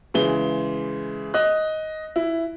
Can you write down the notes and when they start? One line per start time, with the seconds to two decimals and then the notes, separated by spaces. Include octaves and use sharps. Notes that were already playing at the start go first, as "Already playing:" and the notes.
0.14 C#3 E3 G#3 G7
1.34 D#5 F#6
2.16 E4